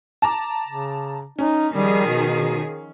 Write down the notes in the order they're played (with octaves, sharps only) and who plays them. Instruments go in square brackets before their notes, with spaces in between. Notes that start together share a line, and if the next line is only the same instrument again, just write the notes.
[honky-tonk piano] A5 A#5 D6
[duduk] C#3
[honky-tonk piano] C#4 [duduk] D#4
[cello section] D#3 F3 G#4 [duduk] G3
[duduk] B2